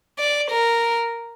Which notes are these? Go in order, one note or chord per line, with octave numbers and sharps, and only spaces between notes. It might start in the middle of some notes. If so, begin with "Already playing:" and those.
D5
A#4